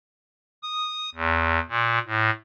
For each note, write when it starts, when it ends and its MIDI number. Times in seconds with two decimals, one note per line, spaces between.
0.63 1.10 87
1.15 1.59 40
1.69 1.99 46
2.06 2.30 45